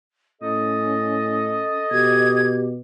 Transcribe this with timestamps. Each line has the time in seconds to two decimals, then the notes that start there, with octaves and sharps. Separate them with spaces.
0.42 A2 C#4 A4 D#5
1.91 B2 G4 G#6